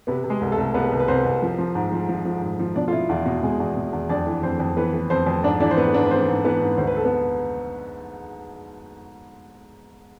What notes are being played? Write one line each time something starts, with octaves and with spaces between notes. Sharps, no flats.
C3 B3 B4
C3
G#3 G#4
C2
A3 A4
C2
C2 B3 B4
C2
B4
C2 C4 C5
C2
F3
F3
G#2
F3
F3
F3
G#2
F3
B2 D4 D5
F4
B2 E4
E2 F4
B2
B2 G#3 G#4
E2
B2
E2
F2 D4 D5
E3
F2 C4 C5
F2
E3 B3 B4
E3
F2 C4 C5
F2
G#2 D4 D5
E3 D4 D5
C5
G#2 B3 B4
G#2 D4 D5
B4
E3 C4 C5
G#2
E3 B3 B4
G#2
D2 C5
B4
A4
B3 B4